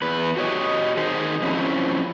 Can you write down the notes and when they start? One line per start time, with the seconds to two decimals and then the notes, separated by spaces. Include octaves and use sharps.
0.02 E2 B4
0.36 F#4 G4 C#5 D#5
0.97 D#3 G#4 C5 D#5
1.43 F3 F#3 C4 C#4 E4